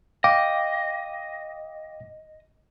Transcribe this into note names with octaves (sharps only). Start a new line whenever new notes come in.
D#5 F5 G5 D6